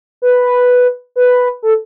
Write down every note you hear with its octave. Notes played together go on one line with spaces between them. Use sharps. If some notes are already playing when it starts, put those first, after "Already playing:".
B4
B4
A4